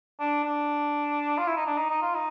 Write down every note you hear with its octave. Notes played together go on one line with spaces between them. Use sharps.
D4
D4
F4
E4
D#4
D4
D#4
D#4
F4
D#4